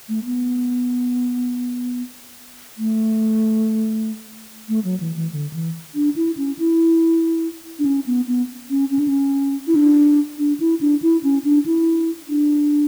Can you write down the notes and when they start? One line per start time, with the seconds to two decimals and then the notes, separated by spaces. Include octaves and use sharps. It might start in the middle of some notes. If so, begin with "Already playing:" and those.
0.09 A3
0.25 B3
2.78 A3
4.69 A3
4.84 F#3
5.00 E3
5.16 E3
5.32 D3
5.53 E3
5.95 D4
6.16 E4
6.37 C#4
6.59 E4
7.79 D4
7.85 C#4
8.06 B3
8.27 B3
8.70 C#4
8.91 C#4
8.99 D4
9.08 C#4
9.67 E4
9.75 D4
10.38 D4
10.60 E4
10.81 D4
11.02 E4
11.24 C#4
11.45 D4
11.66 E4
12.29 D4